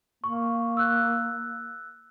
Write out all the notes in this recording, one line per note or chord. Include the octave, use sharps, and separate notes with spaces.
A#3 C#6
E6 F#6